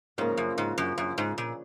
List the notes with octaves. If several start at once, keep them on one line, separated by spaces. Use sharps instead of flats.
G#2 C#3 F3 A#3
F#2
G#2
F#2
F#2
G#2
A#2